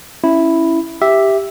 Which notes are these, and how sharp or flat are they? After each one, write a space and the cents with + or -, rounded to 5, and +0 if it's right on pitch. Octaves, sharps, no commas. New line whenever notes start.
C#4 +0 E4 +0
G4 +0 E5 +0